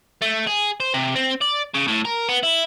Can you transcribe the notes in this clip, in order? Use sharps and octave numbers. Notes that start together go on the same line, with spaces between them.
A3
G#4
C5
C3
C4
D5
C#3
A2
A#4
B3
E4